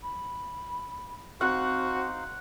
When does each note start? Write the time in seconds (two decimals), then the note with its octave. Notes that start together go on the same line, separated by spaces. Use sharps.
0.03 B5
1.41 C4 D#4 F#4 C5 F5 F#5